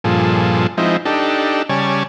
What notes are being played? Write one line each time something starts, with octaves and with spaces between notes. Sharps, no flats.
G2 A#2 F3 G#4 A4
F3 G#3 C4 D#4 E4
D4 D#4 G4 A4
C#3 G3 C#5 D5 G#5 A5